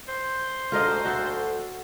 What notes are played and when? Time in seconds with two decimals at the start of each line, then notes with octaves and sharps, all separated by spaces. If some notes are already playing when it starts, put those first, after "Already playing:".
0.08 C5
0.72 D2 F4 A#4 D#5
1.05 F#4 A4